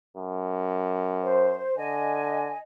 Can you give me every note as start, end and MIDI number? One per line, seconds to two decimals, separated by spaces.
0.17 1.66 42
1.22 1.76 72
1.77 2.52 50
1.77 2.58 75
1.77 2.58 80